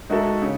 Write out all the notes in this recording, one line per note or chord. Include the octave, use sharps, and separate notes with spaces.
G#3 D#4 F#4 A4 E5
C#3